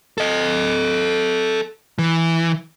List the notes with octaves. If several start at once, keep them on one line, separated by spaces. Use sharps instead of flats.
A4 D#5
E3